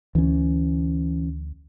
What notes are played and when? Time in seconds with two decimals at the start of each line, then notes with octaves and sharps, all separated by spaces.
0.15 D2 E3 C#4